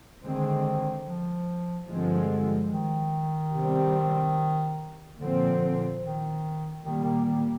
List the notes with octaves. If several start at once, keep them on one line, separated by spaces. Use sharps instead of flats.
D3 D#3 G#3 C4
F3
G2 D3 F3 G#3 C4
D#3
C3 G3 C4
A#2 D3 F3 C4
D#3
A#2 D#3 G3 A#3
D#3
D#3